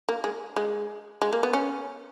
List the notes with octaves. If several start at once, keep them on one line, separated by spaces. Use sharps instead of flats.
A#3
G#3
G#3
G#3
A#3
B3
C#4